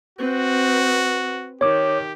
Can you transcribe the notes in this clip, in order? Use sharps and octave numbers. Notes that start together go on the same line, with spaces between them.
C4 F#4 B4
D#3 G4 C#5 D6